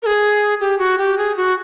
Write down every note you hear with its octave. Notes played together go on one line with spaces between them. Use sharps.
A#4
G#4
G4
F#4
G4
G#4
F#4